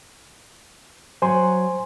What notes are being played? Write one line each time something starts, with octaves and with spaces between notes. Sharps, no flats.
F#3 C5 G#5 C6